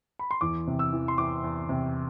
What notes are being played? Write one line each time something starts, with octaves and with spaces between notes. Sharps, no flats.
B5
C6
E2 D6
C3
E6
E3
C6
E2 D6
E2
C3